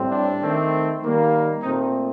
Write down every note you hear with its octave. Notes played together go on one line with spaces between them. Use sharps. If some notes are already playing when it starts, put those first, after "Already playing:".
Already playing: A2 G3 C4
D4
D#3 A3 C4
D#3 G3 A#3
A#2 A3 C4 D#4